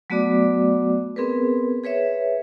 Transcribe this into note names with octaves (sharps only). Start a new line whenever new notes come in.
F#3 A3 B3 F#4 D5 D6
B3 C4 G#4 A#4 B4
G#4 B4 C#5 E5